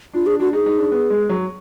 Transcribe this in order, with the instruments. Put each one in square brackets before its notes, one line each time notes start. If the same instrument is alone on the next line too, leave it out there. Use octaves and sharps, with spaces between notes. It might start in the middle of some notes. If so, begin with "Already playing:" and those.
[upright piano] D4 [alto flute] F4
[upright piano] D4 [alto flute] G#4
[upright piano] D4 [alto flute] F#4
[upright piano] D#4 [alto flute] G#4
[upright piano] D#4
D4
B3
G#3
F#3